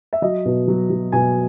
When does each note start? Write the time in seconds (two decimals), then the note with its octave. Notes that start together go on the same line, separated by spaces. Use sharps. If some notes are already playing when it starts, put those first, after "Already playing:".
0.13 E5
0.22 F#3 D#5
0.46 B2
0.68 F#3
0.90 F#3
1.12 B2 G#5